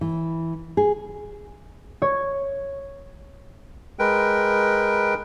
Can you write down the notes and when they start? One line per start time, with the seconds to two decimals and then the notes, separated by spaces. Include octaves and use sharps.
0.01 E3
0.77 G#4
2.02 C#5
3.99 G#3 A#4 B4 G5